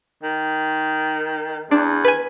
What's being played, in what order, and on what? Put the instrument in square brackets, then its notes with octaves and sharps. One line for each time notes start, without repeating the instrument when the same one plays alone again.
[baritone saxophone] D#3
[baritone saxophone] E2 [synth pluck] D4
[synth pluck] B4 G#5